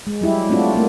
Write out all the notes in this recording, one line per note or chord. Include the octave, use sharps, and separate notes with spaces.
G#3
F#3 G3 E4 G4
A3 C4 D4 F4 F#4
A3 A#3 F#4